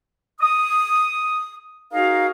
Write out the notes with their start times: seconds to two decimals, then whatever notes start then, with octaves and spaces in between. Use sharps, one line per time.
0.41 D#6
1.94 D#4 F#4 G#4 A#4 D#5 F5